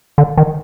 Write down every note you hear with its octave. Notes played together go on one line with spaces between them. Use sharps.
D3
D#3